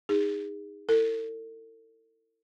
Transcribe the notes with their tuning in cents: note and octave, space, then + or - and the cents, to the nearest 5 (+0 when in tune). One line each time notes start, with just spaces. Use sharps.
D#4 +0 G#4 -30
E4 +0 A4 +40